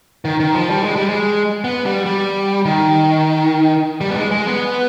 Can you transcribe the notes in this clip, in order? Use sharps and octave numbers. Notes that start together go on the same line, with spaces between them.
D#3
D#3
F3
G3
G#3
G3
G#3
B3
G3
G3
D#3
G3
B3
G#3
G#3
B3